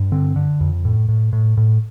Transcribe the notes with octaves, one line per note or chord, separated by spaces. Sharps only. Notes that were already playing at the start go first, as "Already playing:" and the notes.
Already playing: G2
D3 C4
D3
F2
A2
A2
A2
A2